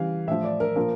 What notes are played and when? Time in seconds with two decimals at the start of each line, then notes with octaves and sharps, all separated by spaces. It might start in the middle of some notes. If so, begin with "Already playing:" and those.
Already playing: C#3 E3 G3 F5
0.28 A2 F3 E5
0.44 D5
0.60 A#4
0.76 A#2 F3 A#4